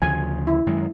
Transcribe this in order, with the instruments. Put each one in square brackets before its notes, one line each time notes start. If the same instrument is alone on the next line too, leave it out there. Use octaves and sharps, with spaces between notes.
[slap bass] D2 C#3 F3 [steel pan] G#5
[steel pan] E4
[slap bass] F#2 D#3 G#3